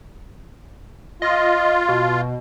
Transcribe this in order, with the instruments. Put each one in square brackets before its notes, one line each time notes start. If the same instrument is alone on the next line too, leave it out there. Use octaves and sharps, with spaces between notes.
[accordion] F4 [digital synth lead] D#5
[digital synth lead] B2